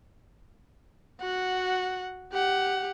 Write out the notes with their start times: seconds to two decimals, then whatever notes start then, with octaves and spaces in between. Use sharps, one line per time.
1.21 F#4 F#5
2.32 G4 F#5